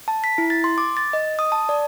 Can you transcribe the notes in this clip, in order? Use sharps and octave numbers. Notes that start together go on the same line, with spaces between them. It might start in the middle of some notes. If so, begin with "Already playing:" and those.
A5
B6
E4
A6
C6
D6
A6
D#5
D#6
A5
D5